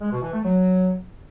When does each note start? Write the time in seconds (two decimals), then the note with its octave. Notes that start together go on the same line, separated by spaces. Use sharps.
0.01 G#3
0.12 B2
0.23 E3
0.33 A3
0.44 F#3